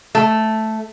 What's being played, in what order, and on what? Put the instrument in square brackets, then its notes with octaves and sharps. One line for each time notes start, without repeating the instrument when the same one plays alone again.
[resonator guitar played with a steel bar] A3